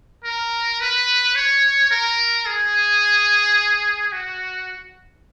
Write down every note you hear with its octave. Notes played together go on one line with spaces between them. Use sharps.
A#4
B4
C#5
A#4
G#4
F#4